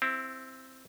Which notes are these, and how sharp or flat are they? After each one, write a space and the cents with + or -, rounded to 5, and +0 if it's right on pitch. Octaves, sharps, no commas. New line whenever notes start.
C4 +0 E4 +10